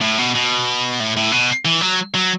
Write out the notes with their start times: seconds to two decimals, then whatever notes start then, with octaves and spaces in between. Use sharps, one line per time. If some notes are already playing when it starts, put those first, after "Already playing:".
0.01 A2
0.19 B2
0.35 B2
1.00 A2
1.17 A2
1.32 B2
1.65 E3
1.81 F#3
2.14 F#3